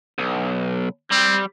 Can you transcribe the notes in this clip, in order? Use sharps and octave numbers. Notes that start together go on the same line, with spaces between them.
B1
G3 C4